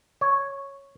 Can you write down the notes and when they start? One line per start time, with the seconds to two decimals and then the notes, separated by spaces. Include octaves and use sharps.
0.21 C#5